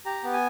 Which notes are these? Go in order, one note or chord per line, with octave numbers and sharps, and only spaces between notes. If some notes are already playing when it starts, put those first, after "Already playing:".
G4 A#5
B3
G#5